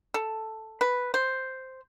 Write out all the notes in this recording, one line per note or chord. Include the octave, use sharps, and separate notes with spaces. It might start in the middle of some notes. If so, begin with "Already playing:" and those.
A4
B4
C5